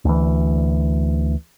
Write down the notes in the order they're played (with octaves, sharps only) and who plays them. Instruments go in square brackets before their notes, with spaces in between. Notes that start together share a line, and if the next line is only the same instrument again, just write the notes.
[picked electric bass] D2 E3